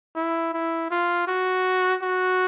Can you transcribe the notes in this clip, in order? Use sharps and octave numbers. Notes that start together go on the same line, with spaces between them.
E4
E4
F4
F#4
F#4